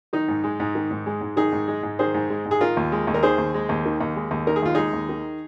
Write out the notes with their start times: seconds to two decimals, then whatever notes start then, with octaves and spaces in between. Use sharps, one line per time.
0.13 D#3 D#4
0.28 G#2
0.44 G#3
0.60 G#2
0.75 D#3
0.91 G#2
1.06 G#3
1.21 G#2
1.36 D#3 D#4 G#4
1.52 G#2
1.68 G#3
1.83 G#2
1.99 D#3 G#4 C5
2.14 G#2
2.30 G#3
2.46 G#2
2.51 G#4
2.61 D#3 F4 A#4
2.77 D#2
2.92 G#3
3.07 D#2
3.14 A#4
3.23 D#3 G#4 C5
3.38 D#2
3.54 G#3
3.69 D#2
3.85 D#3
4.01 D#2
4.16 G#3
4.31 D#2
4.47 D#3 A#4
4.56 G#4
4.62 D#2 F4
4.75 G#3 D#4 G#4
4.93 D#2
5.09 D#3